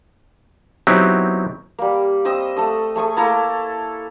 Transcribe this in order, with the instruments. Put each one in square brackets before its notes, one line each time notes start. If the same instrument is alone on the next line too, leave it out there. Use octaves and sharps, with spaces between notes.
[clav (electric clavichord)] F#3 B3 C4 D#4 E4 G4
[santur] G3 A#3
C4 D#5 D#6 E6
A3 A4 D#6
A3 G#4 C#6 D#6
A#3 E4 A4 A#5